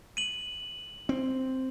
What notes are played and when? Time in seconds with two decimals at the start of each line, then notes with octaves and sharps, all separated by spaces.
0.17 D#7 F#7
1.09 C4